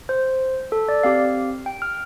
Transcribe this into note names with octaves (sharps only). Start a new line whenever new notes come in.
C5
A4
D5
C4 G4 F5
G5
F6